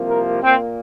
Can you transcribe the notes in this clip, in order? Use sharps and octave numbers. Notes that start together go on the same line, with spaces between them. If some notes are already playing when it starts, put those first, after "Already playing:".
Already playing: C2 C3 F3 A#3
A#4
A#2 A#3 C4